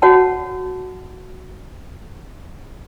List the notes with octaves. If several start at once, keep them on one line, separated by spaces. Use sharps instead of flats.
F#4 C#5 F#5 A5